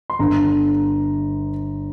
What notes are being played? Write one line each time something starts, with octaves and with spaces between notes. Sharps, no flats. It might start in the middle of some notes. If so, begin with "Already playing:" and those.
C6
G1 G2 D3 A#5